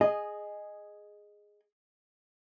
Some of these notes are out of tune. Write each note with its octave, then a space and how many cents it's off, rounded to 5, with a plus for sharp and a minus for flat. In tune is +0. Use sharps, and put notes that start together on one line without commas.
G#4 +0 D#5 -10